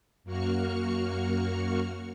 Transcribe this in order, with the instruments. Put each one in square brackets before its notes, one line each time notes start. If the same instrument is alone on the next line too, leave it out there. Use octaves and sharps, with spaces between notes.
[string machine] F#2 A#3 F#4 C#6 F6 C#7